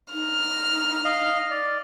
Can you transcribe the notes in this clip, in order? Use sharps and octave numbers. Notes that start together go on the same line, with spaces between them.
D#4 F6
D#5 F5
D5